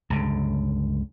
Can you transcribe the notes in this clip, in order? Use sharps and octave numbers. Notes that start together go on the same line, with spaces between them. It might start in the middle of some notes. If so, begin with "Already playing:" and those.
C#2 G2 D3